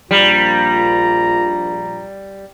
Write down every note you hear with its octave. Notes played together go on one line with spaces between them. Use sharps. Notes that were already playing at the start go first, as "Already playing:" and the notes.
A#1 G3 F4 A#5